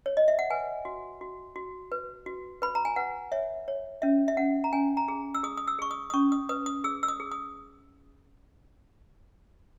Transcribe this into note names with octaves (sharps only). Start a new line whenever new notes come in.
C#5
D#5
E5
F#5
B4 G#5
F#4
F#4
F#4
B4
F#4
B4 B5
A#5
G#5
B4 F#5
C#5 E5
C#5
C#4 E5
E5
C#4 F#5
A#5
C#4 G#5
A#5
G#4
E6
G#4 D#6
D#6
E6
G#4 C#6
D#6
D#6
C#4 C#6
D#6
B4 D#6
D#6
G#4 E6
E6
D#6
G#4
D#6